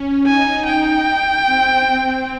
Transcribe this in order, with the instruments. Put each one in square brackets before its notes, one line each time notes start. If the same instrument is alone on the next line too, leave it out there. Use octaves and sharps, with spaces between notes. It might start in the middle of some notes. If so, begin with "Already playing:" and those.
Already playing: [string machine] C#4
[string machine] D#4 [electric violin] G#5
[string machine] D#4 [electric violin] G5
[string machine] C4